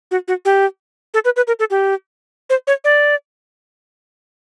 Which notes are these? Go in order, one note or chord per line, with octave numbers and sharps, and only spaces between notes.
F#4
F#4
G4
A4
B4
B4
A#4
A4
G4
C5
C#5
D5